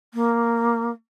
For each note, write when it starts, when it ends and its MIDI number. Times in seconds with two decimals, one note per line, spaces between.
0.14 0.90 58